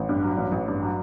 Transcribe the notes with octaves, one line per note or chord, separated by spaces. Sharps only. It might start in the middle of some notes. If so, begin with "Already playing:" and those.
Already playing: A1
G2
F#3
A1
A1
G2
F#3